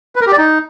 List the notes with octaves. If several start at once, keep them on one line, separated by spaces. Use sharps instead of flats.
B4
A#4
G4
D5
D#4